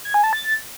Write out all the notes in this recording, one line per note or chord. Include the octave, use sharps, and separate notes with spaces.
G#6
G#5
A5
A6